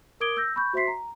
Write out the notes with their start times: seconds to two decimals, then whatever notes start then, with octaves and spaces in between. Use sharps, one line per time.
0.20 A#4 D6 D#6 G#6 D7 G7
0.37 E6 G6 A#6
0.56 B5 C#6 G6
0.73 F#4 C5 E5 C6 B6 C7
0.88 A#5